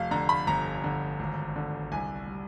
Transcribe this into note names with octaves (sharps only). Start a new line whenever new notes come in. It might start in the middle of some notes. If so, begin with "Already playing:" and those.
Already playing: F1 F5
D3 A#5
B5
G1 A#5
D3
G#1
D3
C2 G#5
G3